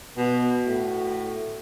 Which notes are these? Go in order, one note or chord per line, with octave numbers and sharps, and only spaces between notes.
B2 F#4
A2